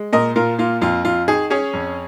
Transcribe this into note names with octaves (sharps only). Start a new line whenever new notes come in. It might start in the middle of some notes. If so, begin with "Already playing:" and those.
Already playing: G#3
A#2 A#4 D#5
A#2 F4 A#4
A#3 F4
F2 F4
F2 F4
D#3 G#4
C#4 G#4 C#5
F2